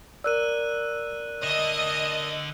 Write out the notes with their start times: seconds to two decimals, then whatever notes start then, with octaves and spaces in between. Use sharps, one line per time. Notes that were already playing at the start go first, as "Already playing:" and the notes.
0.24 A#4 D5 E6 F#6 D#7
1.44 D3 D#5 E5